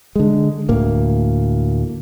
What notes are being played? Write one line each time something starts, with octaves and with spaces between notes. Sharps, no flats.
D3 G#3
D2 A2 A#3